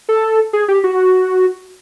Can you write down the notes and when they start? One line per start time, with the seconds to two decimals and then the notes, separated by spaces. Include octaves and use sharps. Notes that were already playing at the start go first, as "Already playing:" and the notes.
0.09 A4
0.53 G#4
0.68 G4
0.84 F#4